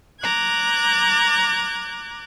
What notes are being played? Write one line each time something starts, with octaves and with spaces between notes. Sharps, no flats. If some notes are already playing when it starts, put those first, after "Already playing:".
A#5 D6 F#6 G#6